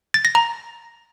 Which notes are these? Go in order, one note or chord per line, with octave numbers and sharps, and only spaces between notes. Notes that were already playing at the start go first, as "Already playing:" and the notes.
A6
A#6
A#5